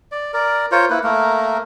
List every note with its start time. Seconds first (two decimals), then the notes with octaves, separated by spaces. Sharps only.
0.12 D5
0.34 A#4 D5
0.72 F4 A#4 C5 C#5
0.90 A#3 E4 B4
1.04 A3 A#3 A#4